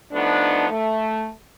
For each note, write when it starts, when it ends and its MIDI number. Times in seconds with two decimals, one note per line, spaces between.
0.12 0.67 53
0.12 0.67 57
0.12 0.67 59
0.12 0.67 62
0.12 0.67 63
0.70 1.27 57